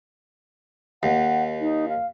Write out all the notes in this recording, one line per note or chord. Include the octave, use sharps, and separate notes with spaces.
D#2 F#5
D#4
F5